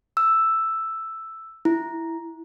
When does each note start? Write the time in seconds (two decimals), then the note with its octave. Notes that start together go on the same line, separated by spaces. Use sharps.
0.17 E6
1.65 E4